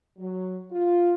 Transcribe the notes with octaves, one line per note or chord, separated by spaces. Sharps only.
F#3
F4